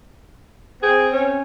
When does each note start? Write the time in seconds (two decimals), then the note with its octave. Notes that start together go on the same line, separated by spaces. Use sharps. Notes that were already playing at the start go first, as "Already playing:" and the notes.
0.83 C4 G#4
1.12 C#4